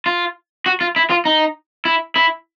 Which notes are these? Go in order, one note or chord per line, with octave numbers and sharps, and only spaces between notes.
F4
F#4
F4
E4
F4
D#4
E4
E4